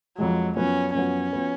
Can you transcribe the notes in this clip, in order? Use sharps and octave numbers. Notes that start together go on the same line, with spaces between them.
F2 F3 F#3 G#3
F#2 F3 B3 C#4 F#4 B4
F#2 F3 B3 C#4 F#4 B4
F3 B3 F#4 B4